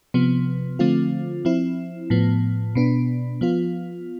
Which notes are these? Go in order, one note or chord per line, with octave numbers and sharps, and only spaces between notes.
C3 F3 B3
D3 F3 A3 C4 F4
F3 C4 E4
A2 F3 B3
B2 B3 D4
F3 B3 F4